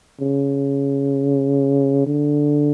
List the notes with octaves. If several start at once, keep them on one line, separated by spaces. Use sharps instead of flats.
C#3
D3